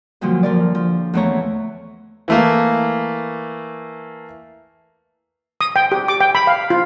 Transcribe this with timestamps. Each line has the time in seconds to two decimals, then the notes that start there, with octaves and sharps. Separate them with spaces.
0.21 G2 A#2 D3 F3 F#3
0.43 F3 A#4 D5
0.75 F3
1.13 E2 E3 A3 E4 C#5 A#5
2.28 E3 A3 A#3
5.61 D#6
5.76 G5
5.92 G4
6.08 D6
6.21 G5
6.35 B5
6.47 F5
6.70 F4